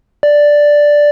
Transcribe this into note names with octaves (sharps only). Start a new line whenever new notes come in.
D5